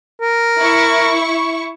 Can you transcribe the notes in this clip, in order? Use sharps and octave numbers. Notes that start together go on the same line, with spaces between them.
A#4
E4 C#6